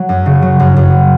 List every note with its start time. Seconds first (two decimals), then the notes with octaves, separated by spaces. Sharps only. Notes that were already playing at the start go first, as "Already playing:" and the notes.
Already playing: F#3
0.09 F#2
0.26 C#3
0.42 F#3
0.59 F#2
0.76 F#2